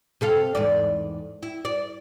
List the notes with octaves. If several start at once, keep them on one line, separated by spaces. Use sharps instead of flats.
C3 A4 F5
E2 G#2 D5
E4
D5